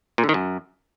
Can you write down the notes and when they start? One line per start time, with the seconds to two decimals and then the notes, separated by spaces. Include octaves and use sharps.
0.18 A#2
0.24 D3
0.29 D#3
0.34 F#2